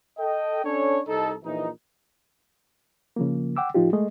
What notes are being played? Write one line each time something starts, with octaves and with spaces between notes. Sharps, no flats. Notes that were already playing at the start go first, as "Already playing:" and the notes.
A4 D#5 G5
C#4 D4 A4 C#5
C2 D#4 A4
A#1 A#2 E3 D#4
C#3 F3 A#3
F#5 G5 D6 E6
A2 F3 D#4 F4 G4
G#3 A3 D#5